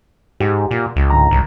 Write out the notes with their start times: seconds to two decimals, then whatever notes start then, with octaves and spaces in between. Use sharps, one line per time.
0.40 G#2 G4 F#5
0.71 A#2
0.96 C#2
1.10 G#2 D3 A#5
1.31 C2